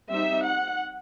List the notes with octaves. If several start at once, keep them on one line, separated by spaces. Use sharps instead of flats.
G3 C4 D#4 E5
F#5